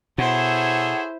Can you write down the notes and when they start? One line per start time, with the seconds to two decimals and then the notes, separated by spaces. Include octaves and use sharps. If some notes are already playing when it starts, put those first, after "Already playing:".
0.18 B2 E4 G#4 A4 C5 C#5 F#5